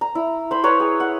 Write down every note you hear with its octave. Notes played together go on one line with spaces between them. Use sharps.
A#5
E4
C5 B5
B4 C#5 A#5
G#4
F#5